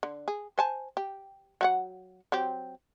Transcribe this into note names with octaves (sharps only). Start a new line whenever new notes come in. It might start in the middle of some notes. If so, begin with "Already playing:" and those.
D3
G#4
C5 G#5 A5
G4
F#3 F#4 F#5
F#3 C4 G4